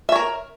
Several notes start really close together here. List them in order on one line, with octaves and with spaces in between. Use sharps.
E5 C#5 A#4